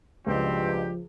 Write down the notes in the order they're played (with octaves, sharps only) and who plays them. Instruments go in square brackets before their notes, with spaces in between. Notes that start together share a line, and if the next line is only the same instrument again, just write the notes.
[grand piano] C#2 [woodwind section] G2 B2 G4 [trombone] F3 [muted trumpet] C4